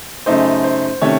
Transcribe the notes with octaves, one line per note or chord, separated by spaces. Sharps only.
F#2 C#3 A3 D#4 C5
C5
C3 D#3 A3 C#4 C#5